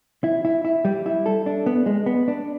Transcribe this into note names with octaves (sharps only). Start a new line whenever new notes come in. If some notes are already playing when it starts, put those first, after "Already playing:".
E4
E4
E4
G3
E4
A4
D4
B3
G#3
B3
D4